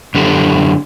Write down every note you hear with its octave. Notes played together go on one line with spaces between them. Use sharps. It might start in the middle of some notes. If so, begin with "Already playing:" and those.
F#2 D3 G4 A4